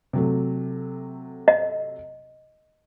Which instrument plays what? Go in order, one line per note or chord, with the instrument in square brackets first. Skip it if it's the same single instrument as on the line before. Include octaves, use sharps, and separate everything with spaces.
[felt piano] C3 F#3 A3
[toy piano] D#5